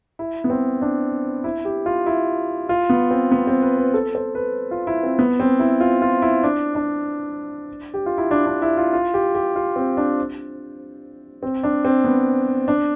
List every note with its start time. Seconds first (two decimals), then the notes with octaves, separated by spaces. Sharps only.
0.19 E4
0.44 B3
0.50 C4
0.82 D4
1.44 E4
1.65 G4
1.86 F4
2.06 E4
2.69 F4
2.90 B3
3.11 C4
3.31 B3
3.47 C4
3.62 B4
3.78 B4
3.94 A4
4.15 C5
4.35 B4
4.71 F4
4.87 E4
5.03 C4
5.19 B3
5.40 C4
5.60 E4
5.80 F4
6.02 F4
6.22 E4
6.43 D4
6.75 D4
7.94 G4
8.06 F4
8.18 E4
8.31 D4
8.46 D4
8.62 E4
8.77 F4
8.93 F4
9.14 G4
9.35 G4
9.56 F4
9.76 C4
9.97 D4
11.43 C4
11.63 D4
11.85 C4
12.04 B3
12.68 D4